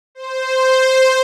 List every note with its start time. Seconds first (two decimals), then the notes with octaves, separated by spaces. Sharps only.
0.15 C5